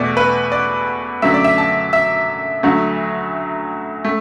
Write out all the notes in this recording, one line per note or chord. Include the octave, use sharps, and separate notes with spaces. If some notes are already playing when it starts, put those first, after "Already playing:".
Already playing: E2 B2 A3 D5
B4
D5
F#2 D3 F#3 A3 E5
D5
E5
A5
E5
D2 D3 F#3 A3
A3